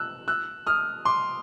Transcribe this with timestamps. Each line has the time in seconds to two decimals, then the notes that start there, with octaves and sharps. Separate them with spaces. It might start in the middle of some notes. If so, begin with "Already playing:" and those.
Already playing: E6 F#6
0.28 E6 F#6
0.67 D#6 F6
1.05 C6 D6